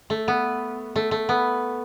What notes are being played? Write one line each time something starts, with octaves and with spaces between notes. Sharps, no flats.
A3
B3
A3
A3
B3